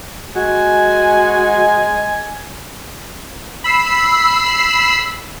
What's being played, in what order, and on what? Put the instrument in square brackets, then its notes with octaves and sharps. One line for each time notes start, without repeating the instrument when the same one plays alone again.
[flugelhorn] G#3 [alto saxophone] F#4 [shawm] G#5
[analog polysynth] B5 E6 C7